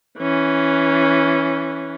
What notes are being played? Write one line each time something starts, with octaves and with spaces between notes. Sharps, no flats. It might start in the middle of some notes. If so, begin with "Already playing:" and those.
E3 C#4